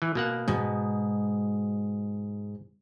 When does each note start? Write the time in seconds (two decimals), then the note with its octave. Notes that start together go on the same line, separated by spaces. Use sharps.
0.02 E3
0.15 B2 A#3 F#5
0.48 G#2 B2